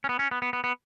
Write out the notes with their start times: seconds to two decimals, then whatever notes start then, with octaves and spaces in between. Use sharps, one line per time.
0.04 C#4
0.09 B3
0.19 C#4
0.31 B3
0.42 B3
0.53 B3
0.64 B3